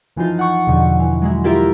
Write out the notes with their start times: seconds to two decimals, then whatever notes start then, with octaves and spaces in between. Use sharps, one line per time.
0.16 F#2 E3 F3 D#4 F4
0.39 F#5 C#6
0.67 E2 B2 D3 F3
1.00 E3
1.22 F#3 G#3 E4
1.44 E4 F4 G4 A#4 E5